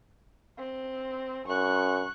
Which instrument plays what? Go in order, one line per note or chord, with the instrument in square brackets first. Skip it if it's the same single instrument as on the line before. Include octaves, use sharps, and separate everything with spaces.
[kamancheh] C4
[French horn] F#2 [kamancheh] C#6 F#6